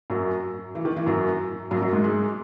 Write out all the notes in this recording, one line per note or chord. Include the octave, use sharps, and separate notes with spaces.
F#2 F#3
E3
D#3
E3
F#2 F#3
F#2 F#3
F#2 F#3
G#2 G#3
G#2 G#3